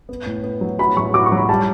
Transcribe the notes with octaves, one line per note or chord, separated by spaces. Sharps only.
B3
A2
B3
F#3
F#4 B5
F#3 C#6
F#4 D6
C#6
F#3
B5
G3 A5